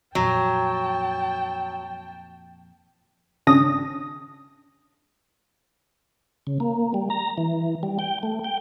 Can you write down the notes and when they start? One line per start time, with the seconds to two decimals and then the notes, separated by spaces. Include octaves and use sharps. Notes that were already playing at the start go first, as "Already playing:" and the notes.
0.15 F2 A#2 F#3 G5 A5
3.47 G#1 C#3 C#4 D4 D#6 A#6
6.47 C#3
6.60 A#3
6.94 G3
7.10 A#5
7.38 E3
7.83 G3
7.99 G5
8.23 A3
8.44 G5